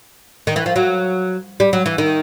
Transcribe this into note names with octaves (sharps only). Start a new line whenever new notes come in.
D#3
E3
F3
F#3
G3
F#3
E3
D#3